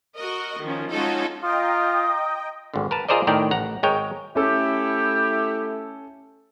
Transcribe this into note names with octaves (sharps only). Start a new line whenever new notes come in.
F#4 A#4 D#5
D#3 F3 C#4
G#3 C#4 D#4 F4 F#4 A4
F4 D#5 G5 A#5 D#6
G#1 D3
A#4 B4 A5
F4 G#4 A#4 C5 D5 D#5
A2 D#3 A#4 D5 G5
A1 F#5 A#5
G#1 G#3 A#4 C#5 G5
A3 C#4 E4 G4 A4